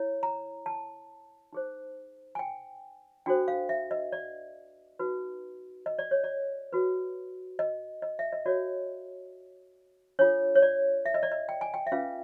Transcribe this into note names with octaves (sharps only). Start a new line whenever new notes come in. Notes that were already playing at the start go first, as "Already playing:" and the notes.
Already playing: E4 C#5
A#5
A5
D#4 G#4 C5
G#5
G5
D4 F#4 A4 C5 G5
F5
E5
D#5
D5
D#4 F#4 B4
D#5
D5
C#5
D5
F#4 B4
D#5
D#5
E5
D#5
F#4 A#4 C#5 D5
D4 F4 A4 C#5
C#5
D5
E5
D#5
D5
D#5
G5
G#5
G5
E5
C#4 F4 G#4 B4 F5